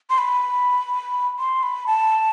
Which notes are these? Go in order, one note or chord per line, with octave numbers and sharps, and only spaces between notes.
C6
B5
C6
B5
A5